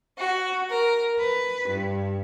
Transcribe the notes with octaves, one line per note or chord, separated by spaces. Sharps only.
F#4
A#4
B4
G2